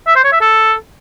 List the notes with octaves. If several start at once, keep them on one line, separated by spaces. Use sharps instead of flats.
E5
C5
C#5
E5
A4